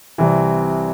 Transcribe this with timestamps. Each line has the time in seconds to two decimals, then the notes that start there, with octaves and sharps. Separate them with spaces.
0.18 C2 C3 E3